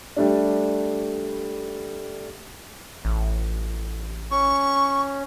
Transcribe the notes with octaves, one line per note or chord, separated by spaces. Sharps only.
G3 A3 D4
A1
C#4 C#6